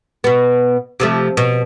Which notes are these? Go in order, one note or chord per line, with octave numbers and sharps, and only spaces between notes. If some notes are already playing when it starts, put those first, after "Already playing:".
B2 B3
C3 F3 A3
B2